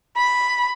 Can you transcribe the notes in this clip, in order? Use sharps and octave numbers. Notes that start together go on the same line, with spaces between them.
B5